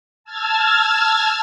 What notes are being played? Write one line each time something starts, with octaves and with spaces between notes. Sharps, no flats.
A5 E6 F6 G#6 A6